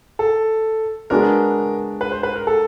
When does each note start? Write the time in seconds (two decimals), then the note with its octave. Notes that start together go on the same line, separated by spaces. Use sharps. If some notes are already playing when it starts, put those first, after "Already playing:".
0.19 A4
1.10 G#3 B3 D4 F#4 A#4
2.01 B4
2.12 C5
2.23 B4
2.36 A#4
2.47 A4